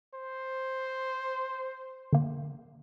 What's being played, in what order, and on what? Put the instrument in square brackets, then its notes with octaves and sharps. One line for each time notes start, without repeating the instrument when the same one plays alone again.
[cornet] C5
[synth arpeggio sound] D3 A#3